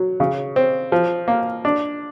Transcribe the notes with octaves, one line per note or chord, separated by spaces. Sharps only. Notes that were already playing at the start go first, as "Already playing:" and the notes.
Already playing: F#3
C#3
C4
F3
A#3
D4